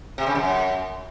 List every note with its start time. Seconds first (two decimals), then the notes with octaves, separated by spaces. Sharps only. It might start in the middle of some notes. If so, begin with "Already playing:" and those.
0.18 C3
0.27 C#3
0.35 F#2